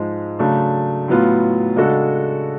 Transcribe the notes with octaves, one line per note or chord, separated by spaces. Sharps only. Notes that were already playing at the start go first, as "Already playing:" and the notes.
Already playing: G#2 F3 G#3
C#3 F#3 A3 D4
A2 F#3 B3 F4
C#3 G#3 D4 F#4 A4